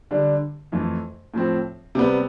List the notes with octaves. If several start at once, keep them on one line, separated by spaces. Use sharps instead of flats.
D3 G3 D4
F2 E3 A3
A2 F3 C4
C3 G3 B3